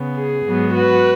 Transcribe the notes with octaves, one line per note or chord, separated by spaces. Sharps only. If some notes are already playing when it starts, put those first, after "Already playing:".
Already playing: C#3 B3
G#4
G#2 F#3 B3
F#4 B4